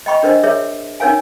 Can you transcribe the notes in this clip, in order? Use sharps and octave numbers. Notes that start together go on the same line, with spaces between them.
D#5 G5 B5 C#6
D4 A#4 C5 D#5
G#4 A#4 C#5 E5
C#4 D#4 A#4 C#5 F5 G#5